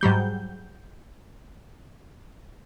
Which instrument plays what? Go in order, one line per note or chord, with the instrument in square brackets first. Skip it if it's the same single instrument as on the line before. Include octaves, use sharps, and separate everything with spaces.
[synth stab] G#2 F#3 G3 G6